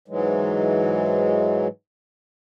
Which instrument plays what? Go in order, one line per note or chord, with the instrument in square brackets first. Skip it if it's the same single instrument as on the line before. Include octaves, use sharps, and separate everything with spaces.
[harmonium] G#2 E3 F#3 G#3